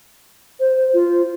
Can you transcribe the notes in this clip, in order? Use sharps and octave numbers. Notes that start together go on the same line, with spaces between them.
C5
F4